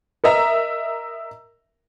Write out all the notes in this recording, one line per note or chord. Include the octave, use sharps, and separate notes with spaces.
A#4 D#5 E5 A#5